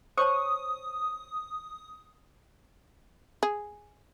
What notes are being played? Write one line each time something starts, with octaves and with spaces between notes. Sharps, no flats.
C5 C#5 A5 C#6 D#6
G#4